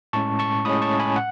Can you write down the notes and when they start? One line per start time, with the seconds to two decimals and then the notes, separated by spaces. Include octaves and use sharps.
0.13 A2 G#3 C#4 A5 C#6
0.39 A5 C#6
0.65 A2 G#3 C#4 B5 D#6
0.82 A5 C#6
0.99 G#5 B5
1.16 F#5